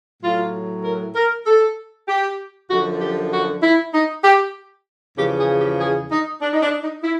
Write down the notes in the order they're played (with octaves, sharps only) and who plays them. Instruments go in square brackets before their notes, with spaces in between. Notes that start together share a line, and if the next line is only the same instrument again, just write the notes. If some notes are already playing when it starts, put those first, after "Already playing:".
[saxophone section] A2 F#3 F4
A#4
A#4
A4
G4
F#2 D3 F3 F#4
G4
F#4
E4
D#4
G4
E2 C#3 F3 G4
G#4
G4
G#4
D#4
D4
D#4
D4
D#4
E4